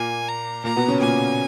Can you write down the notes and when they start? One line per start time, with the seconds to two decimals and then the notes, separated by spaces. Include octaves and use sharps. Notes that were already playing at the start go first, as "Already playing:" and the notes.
Already playing: A#2 A#3 G#5
0.29 A#5
0.64 A#2 A#3 A#5
0.76 B2 B3
0.88 C#3 C#4
1.00 A#2 A#3 G#5